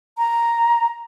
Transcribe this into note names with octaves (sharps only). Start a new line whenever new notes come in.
A#5